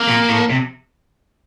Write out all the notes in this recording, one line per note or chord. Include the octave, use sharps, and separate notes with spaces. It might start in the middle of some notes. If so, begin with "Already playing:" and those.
Already playing: A#3
A#2
A2
C3